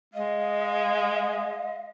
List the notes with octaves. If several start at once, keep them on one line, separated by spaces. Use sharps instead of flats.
G#3 D#5 F5